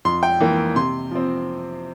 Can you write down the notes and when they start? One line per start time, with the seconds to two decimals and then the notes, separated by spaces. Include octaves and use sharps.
0.05 F2 C6
0.23 G5
0.40 E3 A#3
0.76 C3 C6
1.11 F3 C4